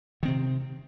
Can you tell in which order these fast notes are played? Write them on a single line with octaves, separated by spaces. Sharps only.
D#3 C4 C3